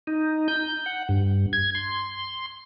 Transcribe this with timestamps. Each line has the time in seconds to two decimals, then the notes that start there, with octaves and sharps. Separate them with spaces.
0.07 D#4
0.48 G6
0.86 F#5
1.09 G2
1.53 G#6
1.75 C6